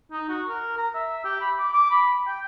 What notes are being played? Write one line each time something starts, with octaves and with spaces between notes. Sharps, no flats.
D#4
F#4
A#4
A#5
E5
G4
B5
D6
D6
B5
G5